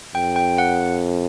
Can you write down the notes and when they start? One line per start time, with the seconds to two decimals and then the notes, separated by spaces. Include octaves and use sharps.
0.14 F2 G5
0.36 G5
0.58 F#5